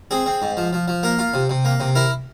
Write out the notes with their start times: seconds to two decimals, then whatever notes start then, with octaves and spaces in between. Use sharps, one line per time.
0.11 C4 G#4
0.26 C4
0.42 G#2
0.57 F3
0.73 F3
0.88 F3
1.03 A#3 A#4
1.19 F4
1.34 C3
1.49 C3
1.65 A#3
1.80 C3
1.95 E4 A#4